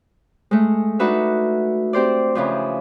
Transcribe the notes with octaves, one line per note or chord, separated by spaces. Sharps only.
G#3 A3
D4 D#4 F#4 B4 E5
C4 G4 C5 D5
C#3 E3 F3